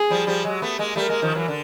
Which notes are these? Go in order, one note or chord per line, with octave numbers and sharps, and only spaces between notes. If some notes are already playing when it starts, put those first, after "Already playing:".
Already playing: G#4
F3 G3
F3 G3
F#3 G#3
A3 B3
G#3 A#3
G3 A3 A#4
G#3 A#3
D#3 F3
E3 F#3
D3